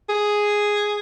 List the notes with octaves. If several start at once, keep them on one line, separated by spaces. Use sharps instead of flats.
G#4